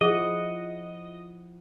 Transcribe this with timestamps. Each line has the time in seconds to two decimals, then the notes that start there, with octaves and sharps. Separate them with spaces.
0.01 F3 E4 G#4 D#5 F#5